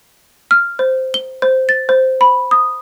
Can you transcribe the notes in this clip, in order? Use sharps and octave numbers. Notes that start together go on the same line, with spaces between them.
F6
C5
G7
C5
A6
C5
B5
D#6